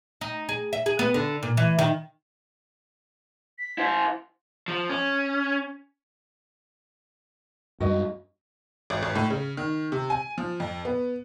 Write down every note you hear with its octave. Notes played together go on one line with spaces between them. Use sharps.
D#4
G#4
E5
G#4
B3
D3
A#2
E3
D#3
B6
E4 C5
F3
C#4
F#2 G3 G#3 F#4 D#5
G#1
G#1
A2
C#3
D#3
C3
G#5
F3
F2
B3